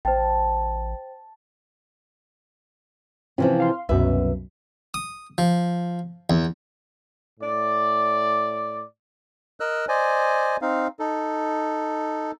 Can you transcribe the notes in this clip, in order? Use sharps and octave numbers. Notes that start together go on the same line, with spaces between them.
A1 C5 G5 A5
C3 E3 F3 C#4 F4
F5 C6
C2 F#2 B2 B4 E5
D#6
F3
E2
A2 D5
A#4 D#5 E6 F#6
C5 D5 D#5 G#5
C4 D#4 F5
D#4 A4